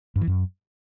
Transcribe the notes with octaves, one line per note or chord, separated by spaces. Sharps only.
G2
E3
F#2